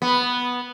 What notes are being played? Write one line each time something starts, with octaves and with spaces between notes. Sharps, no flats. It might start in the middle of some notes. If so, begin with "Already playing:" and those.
B3